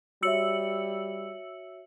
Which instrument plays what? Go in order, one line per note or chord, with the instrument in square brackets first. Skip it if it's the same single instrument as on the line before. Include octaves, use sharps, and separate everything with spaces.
[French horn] G3 [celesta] F#4 C#5 E5 [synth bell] E6 C#7 F#7